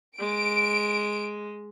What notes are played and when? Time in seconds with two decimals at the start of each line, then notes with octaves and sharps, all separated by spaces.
0.19 G#3 D7